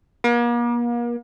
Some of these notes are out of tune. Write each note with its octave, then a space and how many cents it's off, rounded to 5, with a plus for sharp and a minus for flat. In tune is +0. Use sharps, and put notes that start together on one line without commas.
A#3 +40